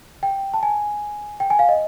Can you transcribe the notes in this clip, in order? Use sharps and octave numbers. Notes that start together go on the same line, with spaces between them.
G5
A5
G#5
G5
G#5
F5
D#5